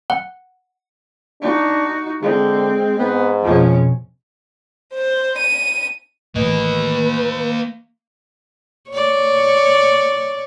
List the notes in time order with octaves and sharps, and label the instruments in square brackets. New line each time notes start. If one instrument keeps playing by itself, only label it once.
[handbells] F#5
[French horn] D4 [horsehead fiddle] D#4 F#4
[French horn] D3 [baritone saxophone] G#3 [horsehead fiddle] C4
[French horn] G#2 [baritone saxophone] B3
[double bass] F2 B2 [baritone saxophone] F3 [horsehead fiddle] G#3 C#4
[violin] C5
D#7
[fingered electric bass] A2 E3 [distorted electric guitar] A#3 D#5 [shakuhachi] B4
[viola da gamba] C#5 D5